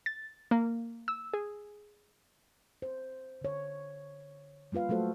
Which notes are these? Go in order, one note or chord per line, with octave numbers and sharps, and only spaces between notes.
A6
A#3
E6
G#4
C5
D3 C#5
G3 A#3 F4 B4 F5
F#3 A3 F#4 A4 C5